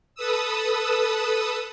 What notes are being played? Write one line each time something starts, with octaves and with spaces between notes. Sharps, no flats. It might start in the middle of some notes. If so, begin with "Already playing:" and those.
A4 B4 D#6 E6